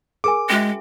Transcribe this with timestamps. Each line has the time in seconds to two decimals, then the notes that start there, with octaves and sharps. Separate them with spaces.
0.24 G#4 A#4 G#5 D6
0.50 G#3 C#4 F#4 E5